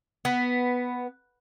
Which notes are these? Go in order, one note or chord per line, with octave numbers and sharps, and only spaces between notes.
B3